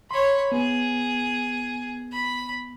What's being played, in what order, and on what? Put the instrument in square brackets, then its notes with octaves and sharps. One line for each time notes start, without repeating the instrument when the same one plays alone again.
[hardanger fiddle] C#5 B5 [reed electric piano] C6
[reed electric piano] B3 [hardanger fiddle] G#4
[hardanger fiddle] B5